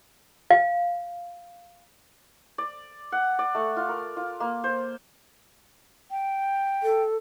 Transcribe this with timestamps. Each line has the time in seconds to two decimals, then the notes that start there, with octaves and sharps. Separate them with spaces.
0.51 F5
2.58 D5
3.12 F#5
3.39 D5
3.55 A3
3.77 F4
3.89 A#4
4.17 F4
4.40 A#3
4.64 C5
6.11 G5
6.83 A4